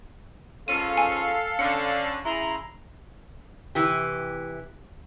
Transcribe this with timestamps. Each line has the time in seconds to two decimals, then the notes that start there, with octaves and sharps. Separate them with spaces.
0.68 G#2 C#4 F4 A4 F5 D#7
0.97 G#5
1.59 D3 C#4 D4 C#7
2.25 C#3 E4 A#5 C6
3.75 C3 E3 G4